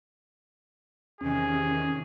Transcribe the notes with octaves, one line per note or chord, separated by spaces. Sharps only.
E2 C3 D#3 C#4 G#4